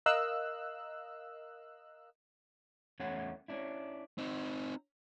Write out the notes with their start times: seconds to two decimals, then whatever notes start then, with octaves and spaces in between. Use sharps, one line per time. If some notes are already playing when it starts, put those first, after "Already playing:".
0.06 A#4 D#5 F5 E6 F#6
3.00 E2 A3 C#4 C#5 F#5
3.48 C#4 D4 E4
4.18 C4 D#4